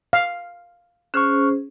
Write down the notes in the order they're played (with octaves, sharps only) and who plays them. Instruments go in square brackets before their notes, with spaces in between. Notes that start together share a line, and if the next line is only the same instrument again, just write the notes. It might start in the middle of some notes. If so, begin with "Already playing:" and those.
[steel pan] F5
[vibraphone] C#4 G#4 C5 [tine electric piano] C#6 F6 F#6